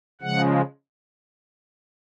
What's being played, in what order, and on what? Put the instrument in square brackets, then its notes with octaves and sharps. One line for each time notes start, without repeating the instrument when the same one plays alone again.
[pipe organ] C#3 F3 G#3 F#5